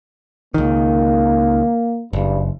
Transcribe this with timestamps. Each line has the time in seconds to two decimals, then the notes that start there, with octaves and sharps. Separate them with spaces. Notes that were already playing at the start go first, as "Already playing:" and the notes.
0.54 C#2 D#3 A#3
2.13 F#1 G2